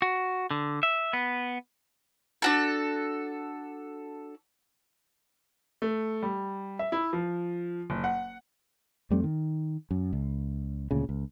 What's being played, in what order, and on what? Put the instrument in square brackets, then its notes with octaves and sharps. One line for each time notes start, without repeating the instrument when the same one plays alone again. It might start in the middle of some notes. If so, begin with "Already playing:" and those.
[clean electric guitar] F#4
D3
E5
B3
[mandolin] D4 F#4 A4
[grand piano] A3
G3
E5
E4
F3
F#1
F#5
[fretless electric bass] F2 G3 A3 C4
D#3
F#2
C#2
D2 A#2 C#3
C#2